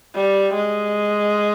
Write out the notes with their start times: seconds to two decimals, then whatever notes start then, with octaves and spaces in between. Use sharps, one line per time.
0.15 G3
0.54 G#3